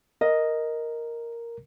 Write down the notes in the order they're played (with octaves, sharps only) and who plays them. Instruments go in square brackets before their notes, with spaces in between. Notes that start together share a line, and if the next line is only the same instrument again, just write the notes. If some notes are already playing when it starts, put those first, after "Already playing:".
[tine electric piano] A#4 [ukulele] D#5